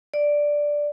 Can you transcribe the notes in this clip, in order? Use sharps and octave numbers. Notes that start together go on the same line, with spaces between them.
D5